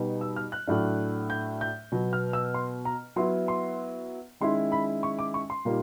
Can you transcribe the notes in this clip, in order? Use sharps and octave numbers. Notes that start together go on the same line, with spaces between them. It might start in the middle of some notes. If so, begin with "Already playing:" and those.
Already playing: B2 G3 B3 D#4
E6
F6
F#6
A2 F#3 A3 D4
G6
G6
B2 F#3 B3
F6
E6
C6
A#5
F#3 B3 E4 C6
C6
D#3 G#3 C#4 E4 C6
B5
C#6
D6
C#6
C6
A#2 G3 A#3 D#4